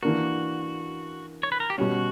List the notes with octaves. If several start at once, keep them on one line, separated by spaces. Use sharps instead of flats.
E3 A#3 D4 F#4 A#4
C#5
B4
A#4
G4
B2 G3 C#4 F#4